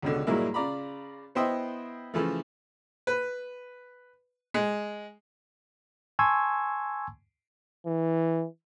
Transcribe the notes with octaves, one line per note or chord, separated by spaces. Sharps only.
C#2 B2 D3
G2 A#2 F#3 G#3 A#3 E4
C#3 F4 D5 A#5 B5
B3 E4 C5 D#5 E5 G5
C#3 E3 F3 A3
B4
G#3
G#5 A5 C6 C#6 E6 G#6
E3